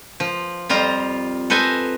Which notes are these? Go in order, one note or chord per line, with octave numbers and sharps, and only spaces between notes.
F3
F2 G3 F4 A#5
A4 B4 C5 D#5 G#5 A#5